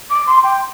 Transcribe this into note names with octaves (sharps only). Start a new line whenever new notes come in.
D6
C6
G5